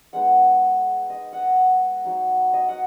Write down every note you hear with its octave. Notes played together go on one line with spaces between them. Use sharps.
G#3 B3 D#4 F#5
D#5
F#5
F#3 D#4
D#5
F#5